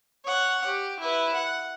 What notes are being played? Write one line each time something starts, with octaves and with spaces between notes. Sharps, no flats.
C#5 F#5
G4
E4 B4
F#5